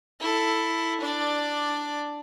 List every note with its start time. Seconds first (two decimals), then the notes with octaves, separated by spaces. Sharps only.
0.20 E4 A4
1.01 D4 D5